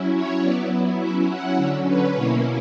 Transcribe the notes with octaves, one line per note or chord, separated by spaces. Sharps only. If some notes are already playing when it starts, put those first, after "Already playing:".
Already playing: F#3 C#4 E4
C#5
F#3 B3 E4 D5
F#3 C#4 E4 E5
F#5
D3 F#3 C#4 E5
B4
B2 A#3 C#4 E4 C#5